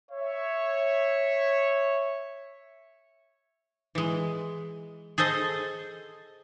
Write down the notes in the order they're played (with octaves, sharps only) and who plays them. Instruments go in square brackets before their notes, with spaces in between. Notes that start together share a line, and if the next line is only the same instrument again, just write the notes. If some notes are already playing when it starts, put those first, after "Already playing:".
[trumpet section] C#5 E5
[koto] E3 G#3
G#4 A4 C5 D#5 A5